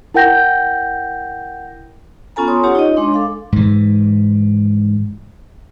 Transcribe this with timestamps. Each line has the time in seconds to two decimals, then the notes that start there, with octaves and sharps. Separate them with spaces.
0.14 E4 A#4 F#5 G5 G6 A#6
2.36 B3 C#4 F4 A4 G#5 A#5
2.48 C#5 C6 D#6
2.63 C#4 F4 G4 C#5 F#5
2.75 D#4 C#5 D#5
2.97 G#3 D4 C6
3.12 A4 F5 D6
3.52 G#2 E3